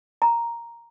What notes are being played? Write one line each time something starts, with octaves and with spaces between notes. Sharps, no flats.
A#5